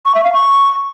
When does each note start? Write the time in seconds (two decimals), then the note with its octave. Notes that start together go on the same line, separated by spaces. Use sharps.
0.05 C#6
0.15 E5
0.24 F5
0.33 C#6